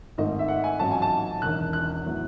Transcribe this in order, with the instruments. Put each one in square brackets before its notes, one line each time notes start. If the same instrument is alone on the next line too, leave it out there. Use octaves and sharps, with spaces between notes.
[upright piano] G#1 G#2 D#3 A3 D#4 D#5
E5
F#5
G#5
A1 G#2 F#3 A5
G#5
A5
E1 E2 D#3 F#6
F#6
A2 F#3 B3 E4